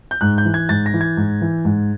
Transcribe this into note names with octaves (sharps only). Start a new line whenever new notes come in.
G6
G#2 F#6
G6
E3
G#6
G#2 A6
A#6
E3
G#6
G#2
E3
G#2